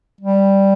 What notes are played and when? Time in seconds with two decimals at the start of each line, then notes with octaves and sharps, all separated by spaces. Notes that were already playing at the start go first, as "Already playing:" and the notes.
0.21 G3